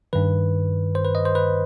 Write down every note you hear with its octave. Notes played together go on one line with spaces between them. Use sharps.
G2 D#3 B4
C5
B4
D#5
C5
B4